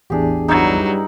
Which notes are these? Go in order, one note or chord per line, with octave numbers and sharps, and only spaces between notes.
A1 E2 D4 G4 G#4
G2 F#3 G3 D#4 E4